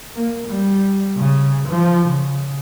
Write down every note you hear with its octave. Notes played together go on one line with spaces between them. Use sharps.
A#3
G3
C#3
F3
C#3